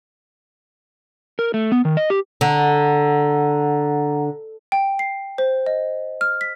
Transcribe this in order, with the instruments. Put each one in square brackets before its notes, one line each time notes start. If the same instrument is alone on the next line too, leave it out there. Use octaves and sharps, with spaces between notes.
[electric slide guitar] A#4
A3
B3
D#3
D#5
G4
[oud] D3 [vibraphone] F#5 A#5
[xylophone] G5
C7
C5
D#5
F6
B6